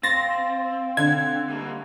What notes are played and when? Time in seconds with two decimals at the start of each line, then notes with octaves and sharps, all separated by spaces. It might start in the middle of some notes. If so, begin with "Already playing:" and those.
0.03 C4 F5 C6 A6 A#6
0.97 D3 G#6
1.50 G3 A#3